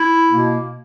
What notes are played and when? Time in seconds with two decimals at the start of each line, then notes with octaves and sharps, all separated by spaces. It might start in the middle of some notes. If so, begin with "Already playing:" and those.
Already playing: E4
0.29 B2 A#3